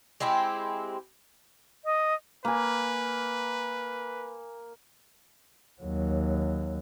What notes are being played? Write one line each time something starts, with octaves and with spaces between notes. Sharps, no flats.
G#3 C4 E4 G4
D#5
A#3 B4 G#5
D#2 F#3